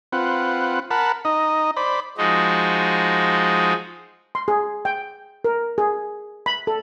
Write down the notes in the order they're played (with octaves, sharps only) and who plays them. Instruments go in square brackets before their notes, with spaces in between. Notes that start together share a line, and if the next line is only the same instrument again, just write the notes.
[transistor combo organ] C4 F4 B4 F#5
A#4 F#5 A5 B5
D#4 D#5
C5 D5 B5
[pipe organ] F3 G#3 D#4 F#4
[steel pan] C6
G#4
G5
A#4
G#4
B5
A4